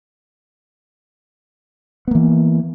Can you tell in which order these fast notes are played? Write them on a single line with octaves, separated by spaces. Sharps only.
B3 A#3 E3